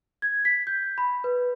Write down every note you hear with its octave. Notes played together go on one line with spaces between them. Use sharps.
G#6
B6
G6
B5
B4